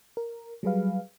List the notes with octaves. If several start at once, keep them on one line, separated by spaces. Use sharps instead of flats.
A#4
F#3 G3 G#4 B4 F5